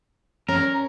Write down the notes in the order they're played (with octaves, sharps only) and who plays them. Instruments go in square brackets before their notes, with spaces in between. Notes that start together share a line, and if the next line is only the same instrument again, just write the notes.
[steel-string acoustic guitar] C#4 [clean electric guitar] A#4